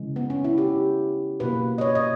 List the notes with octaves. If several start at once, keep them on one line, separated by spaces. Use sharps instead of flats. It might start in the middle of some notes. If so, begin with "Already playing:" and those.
Already playing: C#3 E3 G#3
B3
C#4
E4
G4
B2 A#3 B4
D#5
C#5
D#5